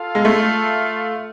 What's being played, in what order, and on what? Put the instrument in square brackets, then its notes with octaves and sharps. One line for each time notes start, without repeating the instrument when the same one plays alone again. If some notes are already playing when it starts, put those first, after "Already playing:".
Already playing: [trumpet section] F4 A4 F5
[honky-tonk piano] G#3
A3